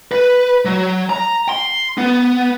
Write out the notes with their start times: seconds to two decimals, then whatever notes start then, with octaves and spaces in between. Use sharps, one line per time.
0.12 B4
0.65 F#3
1.10 A#5
1.49 C6
1.98 B3